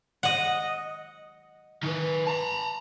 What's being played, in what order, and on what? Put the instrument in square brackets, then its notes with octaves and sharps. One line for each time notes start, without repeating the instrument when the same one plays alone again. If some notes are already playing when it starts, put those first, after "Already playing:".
[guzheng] D#5 F#5
[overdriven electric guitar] D#3 B4
A5 A#5